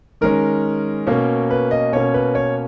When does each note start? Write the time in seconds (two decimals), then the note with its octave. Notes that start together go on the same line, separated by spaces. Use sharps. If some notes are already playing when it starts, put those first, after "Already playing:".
0.21 D#3 G#3 C#4 A#4
1.07 B2 A#3 C#4
1.50 B4
1.71 D#5
1.92 B2 A#3 C#4 C#5
2.14 B4
2.35 C#5